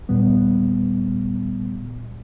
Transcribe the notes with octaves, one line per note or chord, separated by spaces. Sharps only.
D#2 A#2 G3 B3